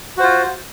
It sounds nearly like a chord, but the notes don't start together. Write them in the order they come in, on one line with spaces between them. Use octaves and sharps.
F#4 C5 F4